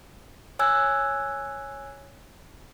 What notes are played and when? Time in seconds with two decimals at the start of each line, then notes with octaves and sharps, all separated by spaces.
0.59 C#5 G#5 E6 F#6 G#6